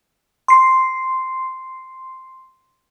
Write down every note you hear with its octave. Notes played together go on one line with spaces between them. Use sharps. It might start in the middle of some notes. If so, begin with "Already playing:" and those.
C6 C7